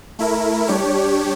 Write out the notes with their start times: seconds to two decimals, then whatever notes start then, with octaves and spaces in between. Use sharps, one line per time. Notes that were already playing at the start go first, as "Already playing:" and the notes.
0.19 A3 E4 A#4
0.67 G3 D4 G4 C#5